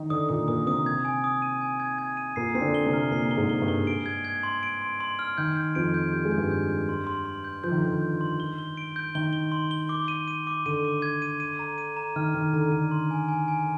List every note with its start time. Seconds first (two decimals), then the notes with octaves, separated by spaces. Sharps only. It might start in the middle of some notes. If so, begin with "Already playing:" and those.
Already playing: D#3 D#4
0.10 D3 D4 D#6
0.29 A#2 A#3 D#6
0.48 A#2 A#3 D#6
0.67 C3 C4 D#6
0.86 G#6
1.05 G#5
1.24 D#6
1.42 D#7
1.61 G#5
1.80 G#6
1.98 G#6
2.17 D#7
2.36 A#2 A#3 C7
2.55 C4 C7
2.61 D3 D4
2.74 G7
2.86 C3 C4
2.93 F6
3.11 A#2 A#3 C7
3.31 G7
3.37 G#2 G#3
3.49 G7
3.62 G2 G3
3.68 G7
3.87 D7
4.06 G#6
4.25 G#6
4.43 C6
4.63 D7
4.81 C6
5.00 C6
5.19 F6
5.38 D#3 G6
5.57 G6
5.75 F2 F3 D7
5.94 G6
6.13 G3 G6
6.25 G#3
6.31 G6
6.37 G2 G3
6.51 G6
6.70 G6
6.89 C6
7.07 C6
7.26 C6
7.44 G6
7.64 F3 G6
7.72 D#3
7.78 D3
7.82 D#3 G6
8.02 G6
8.21 C6
8.40 G7
8.58 G7
8.77 D7
8.96 G6
9.15 D#3 G7
9.33 G7
9.52 C6
9.71 G7
9.89 D6
10.08 D#7
10.28 D#7
10.47 D6
10.66 D3 D#7
10.85 D6
11.02 G#6
11.22 D#7
11.40 D#7
11.59 A#5
11.78 D#7
11.97 A#5
12.16 D#3 F6
12.34 D#3 F6
12.54 D3 A#5
12.72 D3 D#7
12.91 C6
13.11 G#5
13.28 G#5
13.48 G#5